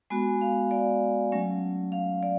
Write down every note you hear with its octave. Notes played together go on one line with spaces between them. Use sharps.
G#3 B3 F#4 G#5
F5
D5
F#3 A3 C#4
F5
D5